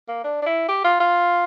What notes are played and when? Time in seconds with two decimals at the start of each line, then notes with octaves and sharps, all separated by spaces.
0.08 A#3
0.24 D4
0.42 D4
0.46 E4
0.69 G4
0.84 F4
1.00 F4